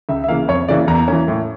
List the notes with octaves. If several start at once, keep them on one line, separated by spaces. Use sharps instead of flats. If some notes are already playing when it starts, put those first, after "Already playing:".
C#2 E5
E5
C#3 E3 A#3 F5
F2 C#5
C#3 E3 A#3 D5
E2 A#5
E3 A#3 C#4
A2